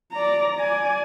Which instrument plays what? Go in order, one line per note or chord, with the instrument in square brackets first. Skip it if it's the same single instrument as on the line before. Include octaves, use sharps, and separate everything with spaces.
[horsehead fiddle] D5 A#5
D5 G#5